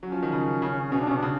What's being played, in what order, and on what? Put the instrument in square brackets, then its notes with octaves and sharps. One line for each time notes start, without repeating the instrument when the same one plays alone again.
[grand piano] F#3 [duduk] C#4
[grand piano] F3
D#3
C#3
C#3
[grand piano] B2 [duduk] C#4
[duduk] D4
[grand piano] C3 [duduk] C#4
[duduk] D4
[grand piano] C#3